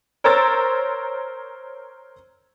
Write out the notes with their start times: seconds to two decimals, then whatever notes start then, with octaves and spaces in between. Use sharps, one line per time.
0.24 A#4 C5 C#5 A#5 E6 A6